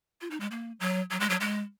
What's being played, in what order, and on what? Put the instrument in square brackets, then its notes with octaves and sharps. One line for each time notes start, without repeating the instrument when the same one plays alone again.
[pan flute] F4
D#4
G#3
A#3
F#3
F#3
G#3
F#3
G#3